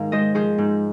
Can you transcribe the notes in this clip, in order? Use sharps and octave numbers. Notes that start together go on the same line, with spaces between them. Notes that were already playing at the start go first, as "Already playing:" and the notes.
Already playing: G#2 D#3 A#4 F5
G#3 C5 D#5
F3 G#4 C5
G#2